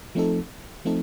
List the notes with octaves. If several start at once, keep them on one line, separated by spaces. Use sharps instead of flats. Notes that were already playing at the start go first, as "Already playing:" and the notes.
F3 A3 C4 D#4 A4
F3 A3 C4 D#4 A4